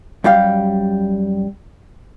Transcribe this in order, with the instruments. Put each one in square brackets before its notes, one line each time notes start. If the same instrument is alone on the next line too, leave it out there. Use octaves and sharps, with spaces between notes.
[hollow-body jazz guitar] F#2 G3 G4 F5